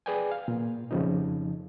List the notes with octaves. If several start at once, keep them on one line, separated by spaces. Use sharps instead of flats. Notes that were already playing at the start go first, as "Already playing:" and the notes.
G#4 B4 D5 G5 G#5
F5
A#2
F2 C#3 F3 D#4